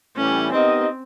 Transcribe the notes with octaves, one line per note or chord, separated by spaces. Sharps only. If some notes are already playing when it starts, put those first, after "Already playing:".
A2 E3 G3 C#4
B3 C4 D#4 G4 A#4 D#5